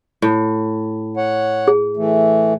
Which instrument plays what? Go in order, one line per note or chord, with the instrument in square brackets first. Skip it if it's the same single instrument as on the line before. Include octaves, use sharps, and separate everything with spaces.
[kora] A2
[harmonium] C#5 F#5
[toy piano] G#4
[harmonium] E3 A3